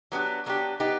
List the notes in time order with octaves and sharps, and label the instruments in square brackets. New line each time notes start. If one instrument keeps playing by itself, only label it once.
[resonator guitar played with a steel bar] F#3 B3 D4 G4
F#3 B3 D4 G4
B3 D#4 G4